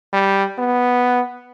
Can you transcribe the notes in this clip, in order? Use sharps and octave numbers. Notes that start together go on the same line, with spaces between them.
G3
B3